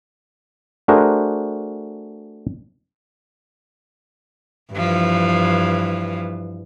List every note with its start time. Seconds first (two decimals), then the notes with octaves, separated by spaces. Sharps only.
0.88 A3 D4 F#4 G#4 A#4 C5
4.72 G2 E3 F3